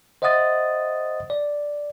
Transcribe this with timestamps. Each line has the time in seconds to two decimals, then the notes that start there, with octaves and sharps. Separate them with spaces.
0.22 C5 D#5 E5 F#5 D#6 A6
1.30 D5